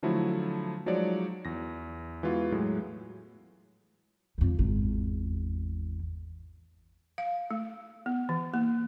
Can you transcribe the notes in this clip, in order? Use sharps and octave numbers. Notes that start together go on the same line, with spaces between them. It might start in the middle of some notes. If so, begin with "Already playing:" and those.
D3 F3 F#3 A3 E4
F3 F#3 G#3 D#4 C#5 D5
E2 A#6
E3 G#3 B3 F4 F#4
A2 F#3 G#3
F2 D3
G#1 E2
F5
A3
B3
E3
A#3